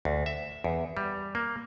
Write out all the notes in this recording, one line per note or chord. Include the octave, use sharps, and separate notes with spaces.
D2
E5
E2
G3
A#3